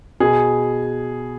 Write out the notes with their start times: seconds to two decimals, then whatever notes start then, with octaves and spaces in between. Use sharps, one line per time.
0.20 B2 G#4